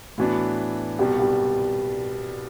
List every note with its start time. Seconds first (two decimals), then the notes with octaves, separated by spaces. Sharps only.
0.18 A2 E3 B3 D4 F#4
0.99 C2 B2 G3 B3 G4
1.19 G4